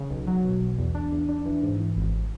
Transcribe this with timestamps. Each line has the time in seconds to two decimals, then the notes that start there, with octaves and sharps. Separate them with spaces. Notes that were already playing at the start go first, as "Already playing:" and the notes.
Already playing: C#3
0.10 B1
0.27 F#3
0.44 B2
0.61 B1
0.78 E2
0.95 D4
1.12 E2
1.29 D4
1.45 E3
1.62 G#2
1.79 E3
1.96 G#1